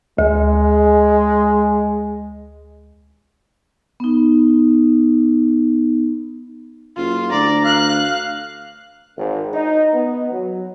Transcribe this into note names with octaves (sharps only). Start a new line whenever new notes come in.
D2 G#3
B3 D#4
F#1 F4
D2 D5 A#5
F5 F#6
G#1
D#4
B3
F#3